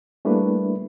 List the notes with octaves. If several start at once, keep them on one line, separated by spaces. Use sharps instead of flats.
G3 A3 A#3 D4 E4 B4